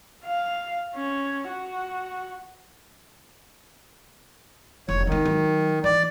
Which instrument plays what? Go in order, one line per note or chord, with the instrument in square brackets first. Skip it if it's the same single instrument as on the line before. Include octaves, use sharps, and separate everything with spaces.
[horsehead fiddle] F5
C#4
F#4
[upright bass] F1 [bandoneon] C#5
[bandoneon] D#3 [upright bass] G#3 D#4
[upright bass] F#3
[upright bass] E3 [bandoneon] D5